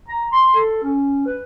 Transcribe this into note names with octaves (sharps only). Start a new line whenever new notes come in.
A#5
C6
A4
C#4
B4